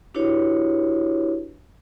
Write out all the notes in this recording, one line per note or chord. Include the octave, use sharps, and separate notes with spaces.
D4 E4 F#4 G4 B4 C#5